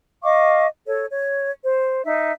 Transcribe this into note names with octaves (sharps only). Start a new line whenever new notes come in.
D#5 F5 C#6 D6
A4 C#5
C#5
C5
D#4 E5